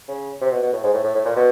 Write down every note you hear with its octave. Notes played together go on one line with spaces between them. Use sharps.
C#3
C3
B2
B2
A2
G#2
A2
A2
A2
A#2
B2